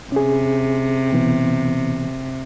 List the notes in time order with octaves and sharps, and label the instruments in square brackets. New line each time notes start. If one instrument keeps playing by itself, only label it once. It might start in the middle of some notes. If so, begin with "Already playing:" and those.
[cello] C3 [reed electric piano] C#4 G#4
[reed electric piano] B2 E3 B3